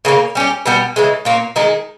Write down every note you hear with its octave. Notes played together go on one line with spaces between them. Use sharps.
C#3 E3 A#3 C#4
G3 C#4 G4
B2 G3 B3
C#3 E3 G#3
A#2 A#3 C#4
D#3 G#3 D#4 G#4